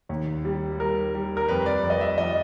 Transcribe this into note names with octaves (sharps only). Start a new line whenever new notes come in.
D#2
G3
G3 A#4
G3
A#4
F2 B4
D5
F2
D#5
E5
F3 D#5